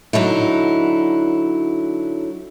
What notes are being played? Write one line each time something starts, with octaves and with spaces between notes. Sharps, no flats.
D3 F#3 D#4 E4